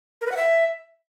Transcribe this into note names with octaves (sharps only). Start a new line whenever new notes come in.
A#4
B4
F#5
E5